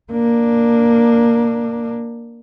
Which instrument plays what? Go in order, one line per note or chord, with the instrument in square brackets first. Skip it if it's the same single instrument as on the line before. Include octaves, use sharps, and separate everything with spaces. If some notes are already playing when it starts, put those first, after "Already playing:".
[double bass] A#3 D4